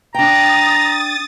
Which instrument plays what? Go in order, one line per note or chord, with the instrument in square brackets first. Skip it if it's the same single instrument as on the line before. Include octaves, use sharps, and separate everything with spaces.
[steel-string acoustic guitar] D4 G5 [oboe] A#5 [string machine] D#6 A6